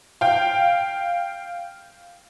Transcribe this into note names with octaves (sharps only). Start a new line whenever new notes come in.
F5 G5